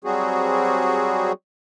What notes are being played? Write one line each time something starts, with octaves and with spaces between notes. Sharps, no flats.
F#3 G3 C4 F#4 G#4